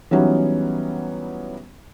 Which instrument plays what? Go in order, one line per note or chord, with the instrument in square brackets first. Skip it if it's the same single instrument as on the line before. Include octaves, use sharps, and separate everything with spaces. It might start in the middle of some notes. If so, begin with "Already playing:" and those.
[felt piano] E3 F#3 G3 B3 C#4 D#4